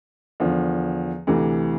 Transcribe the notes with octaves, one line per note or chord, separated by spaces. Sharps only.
E2 D3 F3
D2 C3 E3